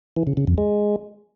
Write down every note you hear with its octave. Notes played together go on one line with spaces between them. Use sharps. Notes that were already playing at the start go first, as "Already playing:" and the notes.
E3
C#3
C#3
F2
G#3